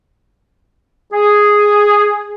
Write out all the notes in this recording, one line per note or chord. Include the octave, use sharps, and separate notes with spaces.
G#4